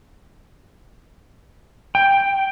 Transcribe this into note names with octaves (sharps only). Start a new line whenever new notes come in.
G5